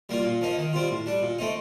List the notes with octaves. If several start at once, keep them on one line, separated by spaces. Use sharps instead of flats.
G3 A#3 F4
A#2
F3 A#3 D#4
D#3
G3 C4 F4
A2
G3 D4
A#2
A3 C4 D#4